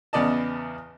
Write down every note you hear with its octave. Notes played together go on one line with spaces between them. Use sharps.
E2 C#3 B3 D5 D#5 A5